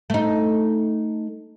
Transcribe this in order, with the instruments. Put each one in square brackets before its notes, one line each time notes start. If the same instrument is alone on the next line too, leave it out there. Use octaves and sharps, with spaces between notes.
[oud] A3 D#4